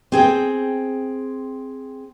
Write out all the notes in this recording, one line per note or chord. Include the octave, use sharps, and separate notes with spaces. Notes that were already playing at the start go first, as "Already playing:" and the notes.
C4 G#4 G5